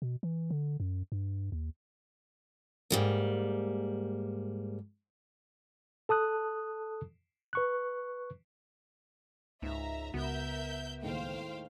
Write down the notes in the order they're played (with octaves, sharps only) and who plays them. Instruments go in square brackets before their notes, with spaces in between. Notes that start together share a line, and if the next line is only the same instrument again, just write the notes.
[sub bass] B2
E3
D3
F#2
G2
D#2
[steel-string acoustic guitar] G#2 G3 A#3
[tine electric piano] A4 A5 D#6 F#6
B4 C#6 F#6
[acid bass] C#2 [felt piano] G#2 [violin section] E5 A#5
[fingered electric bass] C#2 [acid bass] B3 [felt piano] F#4 [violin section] A#4 E5 G6
[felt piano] D#2 A2 G#3 [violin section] C5 F5 G5